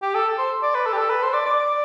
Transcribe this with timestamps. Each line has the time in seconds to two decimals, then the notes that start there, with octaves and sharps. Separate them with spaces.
0.02 G4
0.14 A4
0.38 C5
0.62 D5
0.75 B4
0.86 A4
0.93 G4
0.98 A4
1.10 B4
1.22 C5
1.34 D5
1.46 D5